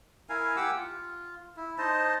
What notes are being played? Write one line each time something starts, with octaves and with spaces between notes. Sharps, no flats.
E4 A#4 F5 G#5
G4 F#5 D6 E6
F4
E4
D#4 C5 D#5 A5